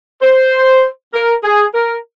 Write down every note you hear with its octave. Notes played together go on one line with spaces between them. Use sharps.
C5
A#4
G#4
A#4